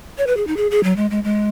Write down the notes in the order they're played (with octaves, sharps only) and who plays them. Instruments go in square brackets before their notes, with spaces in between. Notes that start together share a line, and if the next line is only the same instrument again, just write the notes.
[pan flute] C#5
B4
G#4
D#4
G#4
G#4
F#3
G#3
G#3
G#3